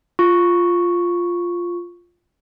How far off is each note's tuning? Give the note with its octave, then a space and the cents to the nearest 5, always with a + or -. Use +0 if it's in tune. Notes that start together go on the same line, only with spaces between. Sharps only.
F4 +0 C#6 +0